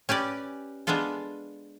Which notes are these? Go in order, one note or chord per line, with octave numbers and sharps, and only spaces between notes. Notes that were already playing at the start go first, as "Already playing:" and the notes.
C#4 G4 B4 D5
G#3 B3 D4 F4 A4